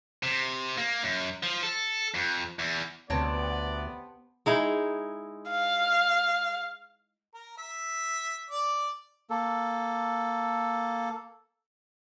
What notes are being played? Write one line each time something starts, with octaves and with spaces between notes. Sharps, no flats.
C3
A#3
F#2
F3
A4
F2
E2
D2 C3 B3 C#5 D5 A5
G#3 D#4 E4
F5
A#4
E5
D5
A#3 A4